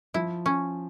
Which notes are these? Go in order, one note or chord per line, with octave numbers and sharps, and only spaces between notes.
F3 E4
C#4